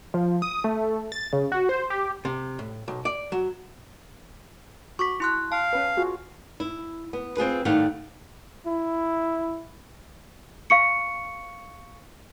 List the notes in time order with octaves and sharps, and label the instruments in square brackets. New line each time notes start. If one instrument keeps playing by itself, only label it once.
[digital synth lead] F3
D#6
A3
A6
C#3
F#4
C5
G4
[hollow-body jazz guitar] C3
A2
B1
D5
F#3
[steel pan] F#4 [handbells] C#6 D6 B6
[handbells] E4 C6 F#6
[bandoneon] F5 [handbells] A5
[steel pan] C#4 B4
F4 F#4 G#4
[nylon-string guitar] E4
B3
C4 F4 G#4 B4
A2 D#3 G3 A3 F5 F#5
[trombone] E4
[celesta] F5 C#6 C#7